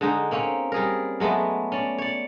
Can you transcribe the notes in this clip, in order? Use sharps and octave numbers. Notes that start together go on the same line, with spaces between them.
D3 G#3 D#4
A#3 C4 C#4
G3 G#4 A#4
F#3 G#3 A3 B3
C#4 D5
C#5 D5